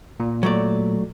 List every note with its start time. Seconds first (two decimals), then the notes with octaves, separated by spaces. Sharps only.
0.20 A#2
0.43 F#3 A3 D5